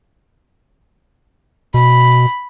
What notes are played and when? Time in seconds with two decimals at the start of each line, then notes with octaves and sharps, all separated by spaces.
1.74 B2 B5